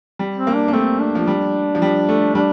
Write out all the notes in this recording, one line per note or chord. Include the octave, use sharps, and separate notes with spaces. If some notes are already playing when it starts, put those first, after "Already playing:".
G3
C4
A#3
D4
A#3
A3 C4
D4
F3
G3
F3
G3
A3
G3 D4